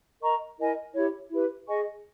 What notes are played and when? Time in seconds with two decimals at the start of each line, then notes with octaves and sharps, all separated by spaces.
0.21 A#4 D#5 A#5 C#6
0.58 E4 A#4 D#5 G#5
0.94 E4 G4 C#5
1.30 E4 G4 B4
1.67 G#4 D#5 G#5 C#6